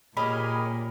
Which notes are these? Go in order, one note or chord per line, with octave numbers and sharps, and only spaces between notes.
A#2 A#3 C#4 G4 G#4 A#4 D#5 B5